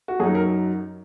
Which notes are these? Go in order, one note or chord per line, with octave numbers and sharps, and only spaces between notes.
F#4
F#2 F#3 D#4 G#4
A#4